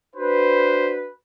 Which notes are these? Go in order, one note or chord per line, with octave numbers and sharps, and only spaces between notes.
D4 F#4 B4 C5